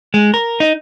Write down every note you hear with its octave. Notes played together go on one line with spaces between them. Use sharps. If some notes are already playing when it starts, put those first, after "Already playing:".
G#3
A#4
D#4